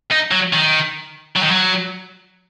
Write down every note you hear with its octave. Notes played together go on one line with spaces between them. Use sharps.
D#4
F#3
D#3
F#3
D#3
F#3